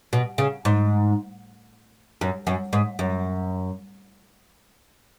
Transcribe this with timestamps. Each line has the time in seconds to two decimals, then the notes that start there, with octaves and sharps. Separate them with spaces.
0.13 B2
0.38 C#3
0.65 G#2
2.21 F#2
2.47 F#2
2.73 G#2
2.99 F#2